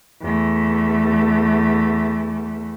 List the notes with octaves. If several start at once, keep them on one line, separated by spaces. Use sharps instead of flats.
E2 A3